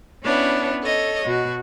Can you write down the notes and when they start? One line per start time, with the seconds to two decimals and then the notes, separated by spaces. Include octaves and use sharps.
0.24 B3 C#4 D4 E4 C#5
0.82 A4 C#5 D#5
1.25 B2 F#4